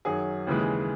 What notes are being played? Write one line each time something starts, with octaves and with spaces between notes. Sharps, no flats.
F#2 D#3 F#3 G#4
D#2 C#3 E3 G#3